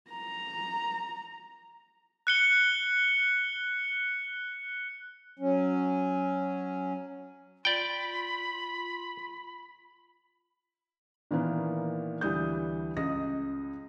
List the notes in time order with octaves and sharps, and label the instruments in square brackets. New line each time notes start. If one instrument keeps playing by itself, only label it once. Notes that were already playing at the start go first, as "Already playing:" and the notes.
[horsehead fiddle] A#5
[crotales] F#6 C#7 G7
[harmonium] F#3 C#4
[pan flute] F4 [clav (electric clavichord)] D5 G5 [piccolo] B5
[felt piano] A#2 D#3 E3 A#3 B3
D2 E3 G3 D#6 G6
C#2 D#5 D#6 A#6